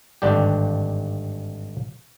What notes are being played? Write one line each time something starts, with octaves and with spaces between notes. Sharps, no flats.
G#1 G2 D3 D4 G4